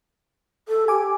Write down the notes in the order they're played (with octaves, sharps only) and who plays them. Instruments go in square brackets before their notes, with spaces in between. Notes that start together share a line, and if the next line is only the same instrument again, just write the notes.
[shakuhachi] A4
[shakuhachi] G4 [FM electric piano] G#5 D6